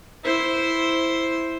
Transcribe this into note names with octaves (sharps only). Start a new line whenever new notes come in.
E4 C5